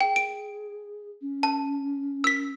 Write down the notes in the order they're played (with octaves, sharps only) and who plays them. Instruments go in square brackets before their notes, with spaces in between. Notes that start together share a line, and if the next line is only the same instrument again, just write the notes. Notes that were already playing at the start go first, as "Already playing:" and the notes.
[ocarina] G#4 [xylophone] G5
[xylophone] D7
[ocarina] C#4
[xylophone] A5
E6 B6